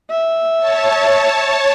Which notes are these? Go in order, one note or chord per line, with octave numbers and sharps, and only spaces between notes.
E5
C#5 A5